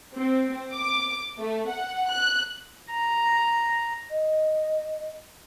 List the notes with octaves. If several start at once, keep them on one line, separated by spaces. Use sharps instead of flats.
C4
D6
A3
F#5
F#6
A#5
D#5